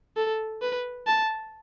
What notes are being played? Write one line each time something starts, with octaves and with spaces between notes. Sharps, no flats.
A4
B4
A5